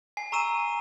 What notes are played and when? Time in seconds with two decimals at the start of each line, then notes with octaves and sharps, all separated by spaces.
0.17 G#5 C7
0.32 A#5 C#6 E6 D#7 E7